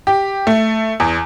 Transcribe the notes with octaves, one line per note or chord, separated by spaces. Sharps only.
G4
A3
E2